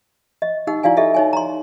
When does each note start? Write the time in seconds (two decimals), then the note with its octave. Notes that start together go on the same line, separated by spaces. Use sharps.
0.42 D#5
0.67 D#4 G4 F#5 E6
0.83 E4 F#4 D5 F5 G#5
0.97 G4 A4 D#5 E5
1.14 D#4 C#5 G#5
1.33 A#5 C6